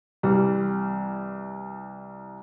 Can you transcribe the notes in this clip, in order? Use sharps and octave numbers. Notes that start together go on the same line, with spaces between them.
C2 E3 G3